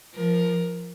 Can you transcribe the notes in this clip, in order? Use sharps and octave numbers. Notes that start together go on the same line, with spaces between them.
F3 A#4